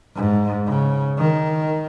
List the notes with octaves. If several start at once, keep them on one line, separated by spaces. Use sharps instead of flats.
G#2
C#3
D#3